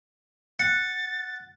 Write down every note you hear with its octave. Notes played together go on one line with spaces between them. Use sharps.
F#5 A6 C#7